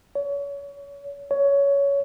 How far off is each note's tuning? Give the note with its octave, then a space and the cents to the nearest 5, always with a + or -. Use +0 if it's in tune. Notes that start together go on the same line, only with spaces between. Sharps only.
C#5 +30
C#5 +15